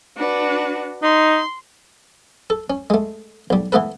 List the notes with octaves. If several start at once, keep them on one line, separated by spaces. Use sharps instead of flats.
D4 F#4 B4
D#4 C6
A4
C#4
G#3 A3
B1 G3
E3 A3 B3 A4 B4